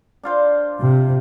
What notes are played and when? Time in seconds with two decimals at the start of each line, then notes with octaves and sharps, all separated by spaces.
0.23 D4 F4 C5
0.80 C3